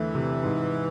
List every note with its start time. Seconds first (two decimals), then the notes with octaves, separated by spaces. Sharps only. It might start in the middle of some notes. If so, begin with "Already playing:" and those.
Already playing: E2 D3 E3 A3
0.14 C3
0.43 G#2